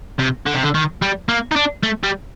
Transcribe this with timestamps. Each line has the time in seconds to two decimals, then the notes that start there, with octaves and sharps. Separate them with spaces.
0.19 C3
0.46 D3
0.54 C3
0.63 D3
0.75 D#3
1.02 G3
1.28 A#3
1.51 D#4
1.56 D4
1.83 A3
2.04 G3